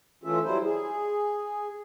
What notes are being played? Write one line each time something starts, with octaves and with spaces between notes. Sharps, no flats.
E3 A3 C#4 F4 E5
F#3 G3 E4 C5
G#4